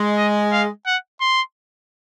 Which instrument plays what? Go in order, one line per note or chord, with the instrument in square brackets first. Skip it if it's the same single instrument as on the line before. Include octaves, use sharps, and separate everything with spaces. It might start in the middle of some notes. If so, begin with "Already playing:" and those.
Already playing: [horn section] G#3
[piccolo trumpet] D#5
F5
F#5
C6